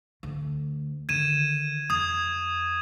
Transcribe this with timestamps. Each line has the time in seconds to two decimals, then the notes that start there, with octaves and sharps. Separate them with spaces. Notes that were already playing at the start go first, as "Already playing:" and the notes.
0.23 D2
1.09 D3 D#3 G#6 D#7 E7
1.90 F2 D#6 G#6